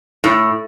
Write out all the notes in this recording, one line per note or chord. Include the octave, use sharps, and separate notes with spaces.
A2